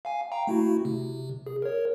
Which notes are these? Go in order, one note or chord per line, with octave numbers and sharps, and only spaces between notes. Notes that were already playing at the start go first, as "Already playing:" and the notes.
F5 G#5
F5 G5 A#5
A3 E4 F#4
C3
G#4
A#4 C#5